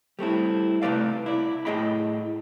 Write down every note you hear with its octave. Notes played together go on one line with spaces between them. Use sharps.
G3 A3 C4 E4
C3 A3 B4 D5 F5
E4 D5
A2 F4 G#4 D#5 G5 B5